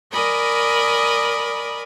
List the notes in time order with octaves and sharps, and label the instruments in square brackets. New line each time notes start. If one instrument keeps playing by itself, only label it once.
[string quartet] A#4 D5 D#5 G#5 B5